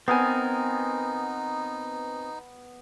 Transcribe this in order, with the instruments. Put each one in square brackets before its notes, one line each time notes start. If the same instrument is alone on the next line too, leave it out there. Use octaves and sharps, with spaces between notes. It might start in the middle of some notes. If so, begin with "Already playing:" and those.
[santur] B3 G#5 [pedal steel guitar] C4 A#4 [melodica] D#4